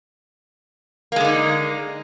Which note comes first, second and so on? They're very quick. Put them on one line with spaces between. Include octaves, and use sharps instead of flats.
A#3 G#3 D3 D#4